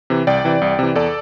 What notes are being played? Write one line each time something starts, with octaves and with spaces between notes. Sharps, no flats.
C3 E3
C2 D5 G5
C3 E3
C2
C3 E3
E2 A4 D5